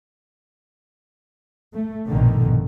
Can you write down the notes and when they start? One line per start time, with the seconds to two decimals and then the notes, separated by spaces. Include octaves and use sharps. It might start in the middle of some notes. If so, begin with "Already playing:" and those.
1.74 A3
2.08 A#1 G2 B2 D3 D#3